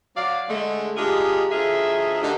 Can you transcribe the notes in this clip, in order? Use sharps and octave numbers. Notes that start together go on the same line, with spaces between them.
F#3 D5 F5
D3 G#3 A3
G#3 D4 D#4 F4 G4 G#4
D2 A3 D#4 F4 G#4 E5
D3 D#3 G4